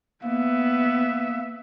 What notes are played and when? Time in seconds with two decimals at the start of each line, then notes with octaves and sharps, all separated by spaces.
0.23 A#3 B3 E5